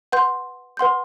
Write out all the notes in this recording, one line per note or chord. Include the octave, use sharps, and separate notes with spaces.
B4 F#5 C6 G6
B4 F#5 C6 G6